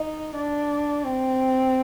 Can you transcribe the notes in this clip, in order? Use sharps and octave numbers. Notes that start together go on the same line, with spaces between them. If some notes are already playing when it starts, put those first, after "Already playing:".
Already playing: D#4
D4
C4